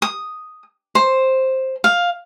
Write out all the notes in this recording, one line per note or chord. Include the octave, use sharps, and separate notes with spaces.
D#6
C5
F5